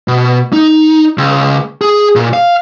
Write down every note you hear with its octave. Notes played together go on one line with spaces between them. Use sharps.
B2
D#4
C#2
G#4
A#2
F5